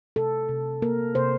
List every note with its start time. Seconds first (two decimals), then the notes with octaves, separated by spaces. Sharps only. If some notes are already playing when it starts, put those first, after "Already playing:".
0.16 C3 A4
0.49 C3
0.82 A#3 A#4
1.15 C3 C5